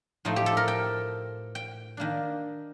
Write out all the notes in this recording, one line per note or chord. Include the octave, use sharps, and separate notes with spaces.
A2 F3 A3 D#4
G4
A4
A#4
G5
G5
D#3 A#3 D4